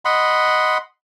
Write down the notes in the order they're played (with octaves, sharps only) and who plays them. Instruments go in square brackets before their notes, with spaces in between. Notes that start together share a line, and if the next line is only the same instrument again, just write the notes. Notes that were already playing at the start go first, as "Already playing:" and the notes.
[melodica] D#5 F#5 B5 C6